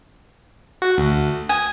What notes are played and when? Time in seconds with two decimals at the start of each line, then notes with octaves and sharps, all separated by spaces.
0.82 F#4
0.98 D2
1.49 G#5 D#6